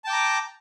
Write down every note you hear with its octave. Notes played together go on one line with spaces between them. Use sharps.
G5 A5 A#5 D6